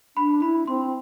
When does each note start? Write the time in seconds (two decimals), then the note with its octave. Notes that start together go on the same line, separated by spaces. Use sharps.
0.16 D4 B5
0.42 E4 B5
0.67 C4 C6